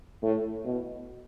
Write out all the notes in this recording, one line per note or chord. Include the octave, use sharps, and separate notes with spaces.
A2
B2